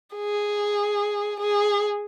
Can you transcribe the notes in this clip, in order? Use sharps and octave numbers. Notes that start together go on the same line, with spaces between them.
G#4
G#4